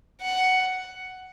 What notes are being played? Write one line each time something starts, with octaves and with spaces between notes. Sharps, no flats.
F#5